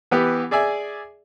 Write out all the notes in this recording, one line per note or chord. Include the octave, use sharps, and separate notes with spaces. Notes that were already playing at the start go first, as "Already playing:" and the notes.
E3 B3 G4
G#4 D5 E5 G#5